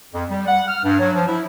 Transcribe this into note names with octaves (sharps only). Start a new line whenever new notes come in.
F2
G3
F#5
F6
G2
F#3
F3
E4